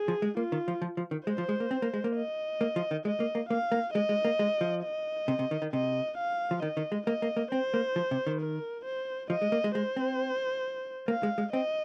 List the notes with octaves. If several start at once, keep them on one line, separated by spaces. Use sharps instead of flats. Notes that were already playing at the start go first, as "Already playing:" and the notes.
Already playing: G#4
F3
G#3
A#3 F4
D#3
F3
F3
F3
D#3
G#3 C5
F3
G#3
A#3
C4
A#3
G#3
A#3
D#5
A#3
F3
D#3
G#3 D#5
A#3
A#3
A#3 F5
A#3
G#3 D#5
G#3
A#3
G#3
F3
D#5
C3
C3
D#3
D#3
C3 D#5
F5
F3
D#3 D#5
D#3
G#3
A#3 D#5
A#3
A#3
C4 C5
A#3
F3
C3
D#3
A#4
C5
F3 D#5
G#3
A#3
G#3
G#3 C5
C4
A#3 F5
G#3
G#3
C4 D#5